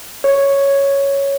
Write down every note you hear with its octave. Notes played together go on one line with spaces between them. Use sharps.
C#5